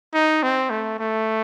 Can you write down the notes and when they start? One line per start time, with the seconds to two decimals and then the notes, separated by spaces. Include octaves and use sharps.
0.14 D#4
0.43 C4
0.70 A3
0.99 A3